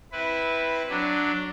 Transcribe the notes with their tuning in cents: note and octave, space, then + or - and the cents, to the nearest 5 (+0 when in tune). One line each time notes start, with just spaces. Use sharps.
C4 +0 E4 -10 B4 +0
F#3 +0 D4 +0